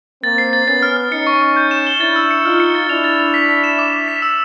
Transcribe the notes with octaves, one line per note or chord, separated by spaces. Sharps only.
A#3 C4 A6
C7
A6
B3 C#4 A6
F6
F6
C#4 D#4 C#7
C#6
C#6
G6
E7
G7
D4 E4 A6
E6
C#7
D#4 F4 F6
C#7
A6
D4 E4 F7
A6
F7
B6
B6
E7
D6
D6
B6
E6